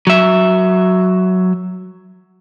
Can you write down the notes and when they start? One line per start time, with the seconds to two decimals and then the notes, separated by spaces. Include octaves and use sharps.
0.07 F#3 E5